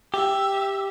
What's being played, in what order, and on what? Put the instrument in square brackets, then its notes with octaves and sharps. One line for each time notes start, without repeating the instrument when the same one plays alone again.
[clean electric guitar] G4 [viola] E5